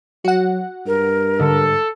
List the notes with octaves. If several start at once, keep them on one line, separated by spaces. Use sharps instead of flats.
F#3 F#4 F#5
G2 A#4
G#2 D3 A4